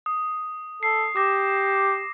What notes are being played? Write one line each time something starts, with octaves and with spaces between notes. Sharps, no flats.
D#6
A4 C7
G4 D6 A#6